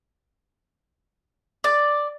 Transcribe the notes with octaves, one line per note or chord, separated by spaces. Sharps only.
D5